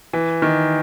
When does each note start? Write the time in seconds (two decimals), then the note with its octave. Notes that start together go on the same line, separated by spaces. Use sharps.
0.13 E3
0.42 D#3